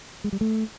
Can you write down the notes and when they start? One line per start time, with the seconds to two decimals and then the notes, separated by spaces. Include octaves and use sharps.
0.24 G#3
0.33 G3
0.41 A3